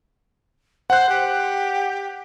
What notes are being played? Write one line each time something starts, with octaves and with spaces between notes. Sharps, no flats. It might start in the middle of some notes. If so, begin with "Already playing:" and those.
C5 F#5 F#6
G4